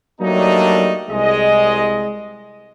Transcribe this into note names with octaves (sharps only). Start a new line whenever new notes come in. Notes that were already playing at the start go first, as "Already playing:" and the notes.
F#3 G3 A3 A#3 D4 D#4
C2 G#3 D#5